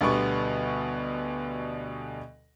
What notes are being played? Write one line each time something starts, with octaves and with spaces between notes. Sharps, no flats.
D2 B2 D3 G3 B3 C#6